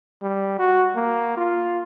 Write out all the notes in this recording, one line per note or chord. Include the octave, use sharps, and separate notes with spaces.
G3
F#4
A#3
F4